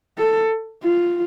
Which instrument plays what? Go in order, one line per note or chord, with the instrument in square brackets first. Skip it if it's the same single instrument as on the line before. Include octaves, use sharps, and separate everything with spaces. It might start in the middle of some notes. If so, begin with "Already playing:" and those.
[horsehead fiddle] A4
F4